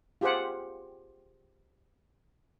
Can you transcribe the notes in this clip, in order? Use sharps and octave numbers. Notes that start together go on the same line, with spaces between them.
F4 G4 G#4 C5 F#5